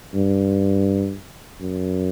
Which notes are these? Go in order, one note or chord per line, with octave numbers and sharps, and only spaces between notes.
G2
F#2